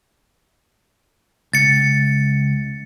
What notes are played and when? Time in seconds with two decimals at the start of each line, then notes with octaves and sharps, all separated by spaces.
1.53 C#2 A6 C#7